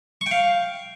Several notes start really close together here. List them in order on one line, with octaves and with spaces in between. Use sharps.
C#6 G5 F5